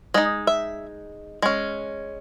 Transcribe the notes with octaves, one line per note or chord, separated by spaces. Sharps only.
G#3 D#4 D#5
E5
G#3 C#4